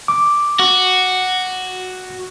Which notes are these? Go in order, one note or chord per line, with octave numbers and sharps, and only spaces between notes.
D6
F#4